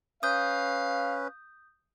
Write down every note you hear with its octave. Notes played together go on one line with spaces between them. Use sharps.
C#4 B4 F5 D#6 G6